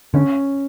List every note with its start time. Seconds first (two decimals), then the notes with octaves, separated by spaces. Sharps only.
0.14 D3 C#4